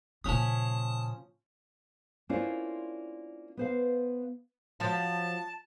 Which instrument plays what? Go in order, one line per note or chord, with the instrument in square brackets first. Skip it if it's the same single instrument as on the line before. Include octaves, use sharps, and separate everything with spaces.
[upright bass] A#2 C#3 [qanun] F3 C#4 B5 [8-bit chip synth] A5 D#6
[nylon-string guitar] A#3 C#4 D4 E4 F4 C5
B3 C5 F5
[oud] F3 F#3 F4 [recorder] A5